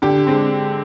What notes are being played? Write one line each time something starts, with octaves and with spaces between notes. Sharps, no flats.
D3 G4
G#3 C4